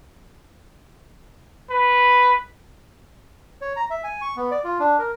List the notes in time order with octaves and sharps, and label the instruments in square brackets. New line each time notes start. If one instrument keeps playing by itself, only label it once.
[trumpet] B4
[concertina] C#5
A#5
E5
G#5
C#6
B3
D5
F4
D4
A#4